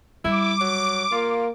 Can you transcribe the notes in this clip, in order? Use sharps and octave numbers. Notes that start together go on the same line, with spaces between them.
G3 E4 D6
F#3
A#3 F4